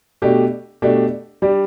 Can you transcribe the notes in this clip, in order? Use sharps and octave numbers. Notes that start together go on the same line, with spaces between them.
B2 A3 D4 G4
B2 A3 D4 G4
G3 D4 G4